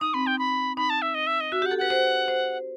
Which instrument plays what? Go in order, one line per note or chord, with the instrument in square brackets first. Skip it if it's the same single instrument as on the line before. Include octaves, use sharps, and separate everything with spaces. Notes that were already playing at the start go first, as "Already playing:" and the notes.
[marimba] D#4 [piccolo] D#6
[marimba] C4 [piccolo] B5
[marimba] D#4 [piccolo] G5
[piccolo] B5
[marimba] D#4 [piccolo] B5
[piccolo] A5
E5
D#5
E5
D#5
[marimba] F#4 [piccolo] E5
[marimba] G4
[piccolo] F#5
[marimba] A4
[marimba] B4 [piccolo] F#5
[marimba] C5
C5